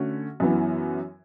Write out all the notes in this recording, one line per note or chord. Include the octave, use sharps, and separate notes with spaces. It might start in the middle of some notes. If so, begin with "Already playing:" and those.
Already playing: D3 A3 C#4 F#4
F#2 E3 B3